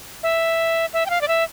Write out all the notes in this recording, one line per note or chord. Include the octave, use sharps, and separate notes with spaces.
E5
E5
G5
F5
D5
E5